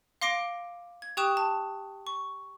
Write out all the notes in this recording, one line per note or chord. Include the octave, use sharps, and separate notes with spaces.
F5 C6 D6 A#6 C7 D7
G#6
G4 G5 C#6 D#6 F#6 E7
A5
C#6